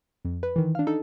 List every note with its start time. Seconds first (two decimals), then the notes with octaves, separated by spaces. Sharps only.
0.25 F2
0.43 B4
0.56 D#3 E3
0.75 D4 F5
0.87 D#4 A4